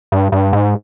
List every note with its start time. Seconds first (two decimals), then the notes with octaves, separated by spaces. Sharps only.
0.12 G2
0.32 G2
0.53 G#2